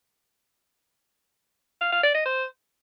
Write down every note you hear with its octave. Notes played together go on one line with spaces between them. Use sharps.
F5
F5
D5
D#5
C5